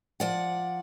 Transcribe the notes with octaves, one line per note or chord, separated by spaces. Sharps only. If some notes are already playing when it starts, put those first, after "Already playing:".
F3 D5 F#5